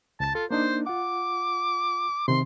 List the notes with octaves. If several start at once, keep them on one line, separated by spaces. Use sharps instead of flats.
C#2 A5 A6
F4 A4
A#3 D4 D#4 C5
F4 F#5 D6
C3 D#3 C4 C6